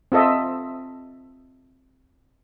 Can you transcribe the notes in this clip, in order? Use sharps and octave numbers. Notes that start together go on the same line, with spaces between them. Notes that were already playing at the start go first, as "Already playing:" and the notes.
C4 F4 A4 D#5 E5